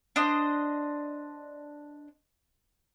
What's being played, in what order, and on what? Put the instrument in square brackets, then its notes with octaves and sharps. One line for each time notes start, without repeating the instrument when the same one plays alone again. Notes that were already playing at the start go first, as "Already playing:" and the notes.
[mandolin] D4 C5 D#5